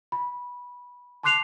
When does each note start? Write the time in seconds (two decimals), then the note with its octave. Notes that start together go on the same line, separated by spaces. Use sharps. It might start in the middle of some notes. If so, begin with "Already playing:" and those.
0.12 B5
1.23 A5 C6 D6 F#6 C7 F7